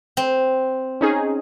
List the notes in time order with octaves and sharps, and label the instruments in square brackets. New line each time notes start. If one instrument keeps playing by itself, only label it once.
[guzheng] C4
[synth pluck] C#4 D#4 G#4